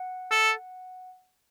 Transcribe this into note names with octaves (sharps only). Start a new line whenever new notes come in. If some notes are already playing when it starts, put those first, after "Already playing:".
Already playing: F#5
A4